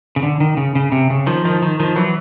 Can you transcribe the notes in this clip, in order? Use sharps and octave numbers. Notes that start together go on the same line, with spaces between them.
C#3
D3
D#3
C#3
C#3
C3
C#3
D#3 F3
D#3 F3
D#3
D#3 F3
E3 F#3